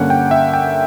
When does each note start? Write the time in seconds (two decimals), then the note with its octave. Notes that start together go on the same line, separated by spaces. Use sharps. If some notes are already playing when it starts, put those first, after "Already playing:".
Already playing: G2 D3 A#3 C#4 F#5
0.10 G5
0.31 E5
0.54 G5